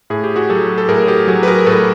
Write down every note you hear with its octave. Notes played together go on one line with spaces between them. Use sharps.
A2 G#4
G4
F#4 G#4
F#3 G4 A4
A4
A2 G#4 A#4
G4 A4
F#3 F#4 G#4
B4
G#4 A#4
A2 A4 B4